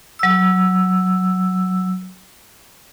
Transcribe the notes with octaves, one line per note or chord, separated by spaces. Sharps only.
F#3 E6